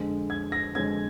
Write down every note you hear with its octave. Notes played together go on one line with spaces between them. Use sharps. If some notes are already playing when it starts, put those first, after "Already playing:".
Already playing: F2 D3 G#3 C4
G#6
A#6
F2 D3 G#3 C4 G#6